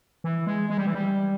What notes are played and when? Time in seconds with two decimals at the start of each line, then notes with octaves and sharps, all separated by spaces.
0.24 E3
0.47 G#3
0.70 G#3
0.77 G3
0.87 E3
0.94 G3